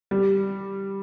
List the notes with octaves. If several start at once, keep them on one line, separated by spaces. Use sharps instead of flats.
G3